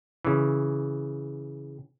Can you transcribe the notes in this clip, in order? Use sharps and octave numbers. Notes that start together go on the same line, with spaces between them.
C#3 E3